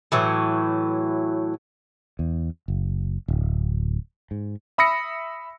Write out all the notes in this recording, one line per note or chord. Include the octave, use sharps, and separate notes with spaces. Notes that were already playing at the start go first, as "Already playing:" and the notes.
A2 E3 F#3
E2
F#1
D1
G#2
E5 B5 D#6 E6 A#6 C#7